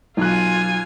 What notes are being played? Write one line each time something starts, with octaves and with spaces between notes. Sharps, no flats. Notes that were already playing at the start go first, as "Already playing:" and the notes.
B1 F4 G#5 F#6